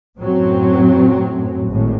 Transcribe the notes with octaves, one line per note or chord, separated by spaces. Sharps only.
F#2 A2 F#3 C4
G#1 A2